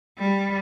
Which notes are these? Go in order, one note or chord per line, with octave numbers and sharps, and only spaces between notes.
G3